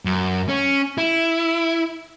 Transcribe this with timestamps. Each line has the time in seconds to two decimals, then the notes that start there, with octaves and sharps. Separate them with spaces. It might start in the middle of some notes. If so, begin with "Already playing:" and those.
0.05 F#2
0.49 C#4
0.98 E4